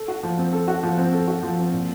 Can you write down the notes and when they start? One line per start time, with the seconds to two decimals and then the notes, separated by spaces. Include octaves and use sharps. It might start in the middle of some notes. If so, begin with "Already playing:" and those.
Already playing: A4
0.08 F#4
0.23 F3
0.38 C4
0.53 A4
0.68 F#4
0.83 F3
0.98 C4
1.13 A4
1.27 F#4
1.43 F3
1.58 C4
1.73 A#2